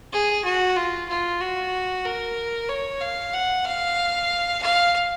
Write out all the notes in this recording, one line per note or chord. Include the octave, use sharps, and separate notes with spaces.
G#4
F#4
F4
F4
F#4
A#4
C#5
F5
F#5
F5
F5